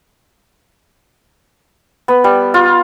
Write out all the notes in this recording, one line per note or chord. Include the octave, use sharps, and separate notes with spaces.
B3
G3
F4